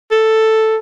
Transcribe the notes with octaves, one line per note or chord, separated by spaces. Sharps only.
A4